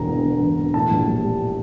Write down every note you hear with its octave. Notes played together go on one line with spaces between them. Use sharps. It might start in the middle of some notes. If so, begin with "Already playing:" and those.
Already playing: E1 D3 A#5
E2
D3
E1
E1
A2 A5
A#1
G3
G3